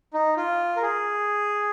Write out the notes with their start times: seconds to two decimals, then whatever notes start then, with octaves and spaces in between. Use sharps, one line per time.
0.14 D#4
0.37 F4
0.76 A#4
0.82 G#4